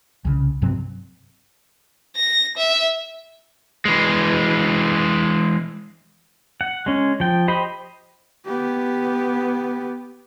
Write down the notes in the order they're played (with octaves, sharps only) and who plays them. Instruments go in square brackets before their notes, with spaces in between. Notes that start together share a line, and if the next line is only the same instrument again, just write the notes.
[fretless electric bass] C2 C#3
G2 C3 F#3 C4
[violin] A#6
E5
[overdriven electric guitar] E3 G#3
[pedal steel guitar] F#5
G#3 C#4
F3 G5
G4 C5 D#5 B5
[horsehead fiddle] B3 G4